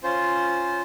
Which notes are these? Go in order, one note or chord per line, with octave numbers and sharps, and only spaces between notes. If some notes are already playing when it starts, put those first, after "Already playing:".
C#4 F4 C5